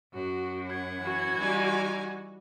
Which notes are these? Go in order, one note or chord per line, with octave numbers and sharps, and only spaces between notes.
F#2 F#4
F#5 G#6
E3 F#4
G3 D#4 G#5